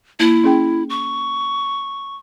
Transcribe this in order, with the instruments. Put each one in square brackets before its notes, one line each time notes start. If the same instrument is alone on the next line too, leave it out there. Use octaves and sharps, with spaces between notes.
[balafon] A#3 [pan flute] E4
[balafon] C#4 G#4 G5
[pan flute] C#6